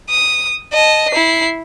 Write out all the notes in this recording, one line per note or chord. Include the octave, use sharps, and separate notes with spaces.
D#6
D#5 A5
E4 C7